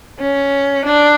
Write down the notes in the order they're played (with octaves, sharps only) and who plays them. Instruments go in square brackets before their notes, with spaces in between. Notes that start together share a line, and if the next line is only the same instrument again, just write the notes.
[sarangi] C#4
D4